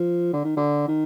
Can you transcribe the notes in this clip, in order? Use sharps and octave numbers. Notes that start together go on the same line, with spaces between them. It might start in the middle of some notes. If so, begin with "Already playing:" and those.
Already playing: F3
D3
D#3
D3
D#3